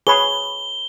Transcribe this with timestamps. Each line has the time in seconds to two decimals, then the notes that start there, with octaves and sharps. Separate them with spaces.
0.07 G#4 B4 C#5 B5 C#6 G7